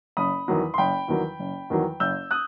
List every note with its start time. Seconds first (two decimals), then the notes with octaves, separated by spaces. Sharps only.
0.17 F#1 B5 D#6
0.48 E2 D#3 F#3
0.74 C6
0.78 F#1 G5 B5
1.08 E2 D#3 F#3
1.39 F#1
1.70 E2 D#3 F#3
2.00 F#1 E6 G6
2.31 D#6 F#6